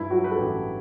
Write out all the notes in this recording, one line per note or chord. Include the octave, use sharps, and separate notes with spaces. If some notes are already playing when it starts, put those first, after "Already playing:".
Already playing: G2 E4
F#3 F#4
B4
A4
A1 G4